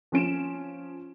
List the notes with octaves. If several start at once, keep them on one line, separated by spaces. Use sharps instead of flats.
F3 C#4 D7 E7